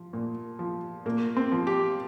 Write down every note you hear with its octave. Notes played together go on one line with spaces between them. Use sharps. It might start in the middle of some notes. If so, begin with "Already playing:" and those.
Already playing: F3
A#2
F3
A#2 A#3
C4
F3
G4